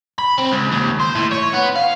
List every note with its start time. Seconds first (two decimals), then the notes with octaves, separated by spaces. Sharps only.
0.19 B5
0.39 C4
0.53 C#2
0.72 D#2
1.00 C5
1.15 A2
1.32 C#5
1.54 B3
1.76 F5